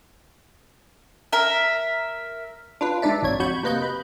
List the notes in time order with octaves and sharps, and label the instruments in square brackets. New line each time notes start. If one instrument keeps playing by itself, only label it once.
[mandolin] A#4 E5
[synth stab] D4 F4 B4
G#3 D4 D#4 D5 E5
G#1 F2 C#5 G#6
F2 F#4 B5 C#6 G6
C3 A#3 B4 D#5 G6
B5